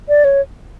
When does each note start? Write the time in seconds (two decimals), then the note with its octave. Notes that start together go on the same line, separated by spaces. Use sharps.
0.09 D5
0.24 C#5